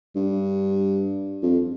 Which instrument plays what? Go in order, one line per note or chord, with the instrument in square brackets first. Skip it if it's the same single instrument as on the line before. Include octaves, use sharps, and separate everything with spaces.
[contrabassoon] G2
F2